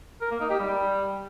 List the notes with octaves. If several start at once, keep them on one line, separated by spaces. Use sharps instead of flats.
A#4
A#3
D#4
G4
G3